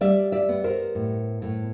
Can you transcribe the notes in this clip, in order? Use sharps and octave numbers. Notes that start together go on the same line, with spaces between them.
G3 D5 E5
D5 E5
B3
A#4 C5
A2
A2